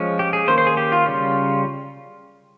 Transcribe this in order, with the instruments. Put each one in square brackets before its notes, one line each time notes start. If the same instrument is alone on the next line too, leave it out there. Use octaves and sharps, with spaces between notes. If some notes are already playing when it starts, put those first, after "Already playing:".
Already playing: [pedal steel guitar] F3 G#3 C#4
G4
G#4
D#3 A#3 C#4 C5
C5
G#4
G4
F4
C#3 G3 C#4